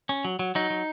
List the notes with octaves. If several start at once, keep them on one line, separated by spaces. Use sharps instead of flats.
C#4
F#3
F#3
F#3 D#4
F#3